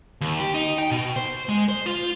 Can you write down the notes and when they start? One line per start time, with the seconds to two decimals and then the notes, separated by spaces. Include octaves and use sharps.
0.21 D#2
0.40 G4
0.54 D#4
0.78 G5
0.91 B2
1.16 C5
1.49 G#3
1.68 C5
1.86 F4